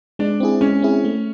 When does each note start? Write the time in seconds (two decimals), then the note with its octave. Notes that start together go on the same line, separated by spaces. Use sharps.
0.19 G#3 D4
0.40 C4 E4 G#4
0.61 G#3 C#4
0.82 C4 E4 G#4
1.05 A3